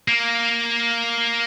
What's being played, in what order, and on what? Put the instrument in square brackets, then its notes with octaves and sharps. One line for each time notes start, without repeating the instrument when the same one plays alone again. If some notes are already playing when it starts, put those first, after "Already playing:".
[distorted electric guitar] A#3